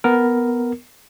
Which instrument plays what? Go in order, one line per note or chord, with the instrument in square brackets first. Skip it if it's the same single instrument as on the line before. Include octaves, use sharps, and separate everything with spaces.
[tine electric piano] B3 A#4